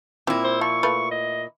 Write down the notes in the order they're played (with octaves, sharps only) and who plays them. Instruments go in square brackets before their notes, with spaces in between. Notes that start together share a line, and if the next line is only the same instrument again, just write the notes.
[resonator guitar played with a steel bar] A#2 E4 [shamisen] C4
[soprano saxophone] C5
[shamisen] F3 [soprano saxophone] C#6
[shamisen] A3 F4 B4
[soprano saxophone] D#5